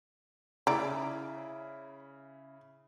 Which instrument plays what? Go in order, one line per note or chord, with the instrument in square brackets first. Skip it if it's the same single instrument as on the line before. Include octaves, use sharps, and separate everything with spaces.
[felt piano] C#3 E4 [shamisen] D5 A#5